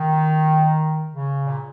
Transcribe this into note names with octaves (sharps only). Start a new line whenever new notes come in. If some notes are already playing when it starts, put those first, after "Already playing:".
Already playing: D#3
C#3
A#2